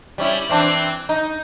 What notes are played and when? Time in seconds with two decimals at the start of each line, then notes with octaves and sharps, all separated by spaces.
0.18 G3 C#4 E4
0.49 E3 C4 D4
1.09 D#4